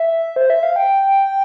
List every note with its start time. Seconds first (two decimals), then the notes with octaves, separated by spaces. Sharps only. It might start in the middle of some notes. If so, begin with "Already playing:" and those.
Already playing: E5
0.36 C5
0.50 E5
0.63 F5
0.76 G5